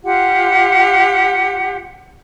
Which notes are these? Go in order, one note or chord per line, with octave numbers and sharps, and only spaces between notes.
F4 G4 F#5